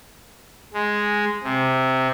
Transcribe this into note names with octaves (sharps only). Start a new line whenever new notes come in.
G#3
C3